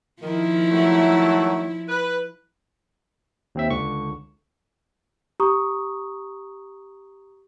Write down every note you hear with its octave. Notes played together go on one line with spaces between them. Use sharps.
D#3 F3 E4
D#3 F#3 A3
B4
D#2 C4 E5
C#2 D3 C#6
G4 A#5 C#6 D#6